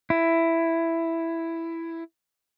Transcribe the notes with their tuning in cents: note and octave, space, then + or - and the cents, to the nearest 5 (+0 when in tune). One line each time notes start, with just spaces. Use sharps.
E4 +5